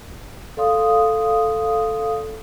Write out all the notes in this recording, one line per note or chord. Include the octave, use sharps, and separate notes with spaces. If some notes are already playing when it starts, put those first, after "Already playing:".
A4 D5 F5 C6 D#6